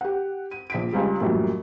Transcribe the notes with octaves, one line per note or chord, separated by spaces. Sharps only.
G4 F#5
D#7
A#1 B6 D7
C#2 G3 G#3
A1 F#2 A#2 G3